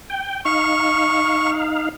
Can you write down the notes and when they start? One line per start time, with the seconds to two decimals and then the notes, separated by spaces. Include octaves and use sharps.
0.10 G5
0.45 D#4 F5 C#6